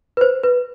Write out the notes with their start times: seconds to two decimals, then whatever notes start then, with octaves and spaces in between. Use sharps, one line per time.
0.17 B4
0.21 C5
0.43 B4